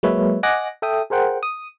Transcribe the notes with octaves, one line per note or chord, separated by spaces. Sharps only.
F#3 G#3 A#3 B4 C#5 E5
D#5 F#5 G#5 D6 F#6 A#6
A4 E5 G5 D#6
G#4 A#4 C5 F#5 G5
D#6